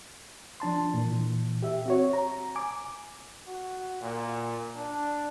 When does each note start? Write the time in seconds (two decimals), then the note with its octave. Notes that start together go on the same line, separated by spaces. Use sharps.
0.60 F3 D4 A5 C6
0.94 A#2 E3
1.63 G4 E5
1.86 C4 F#4 C#5
2.13 A#5
2.56 G#5 D6
3.46 F#4
4.01 A#2
4.76 D4